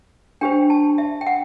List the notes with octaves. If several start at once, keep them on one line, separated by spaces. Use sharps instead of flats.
D4 G4 C5 G5
A5
E5
G5
F#5